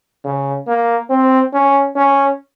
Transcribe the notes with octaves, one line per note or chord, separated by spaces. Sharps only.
C#3
A#3
C4
C#4
C#4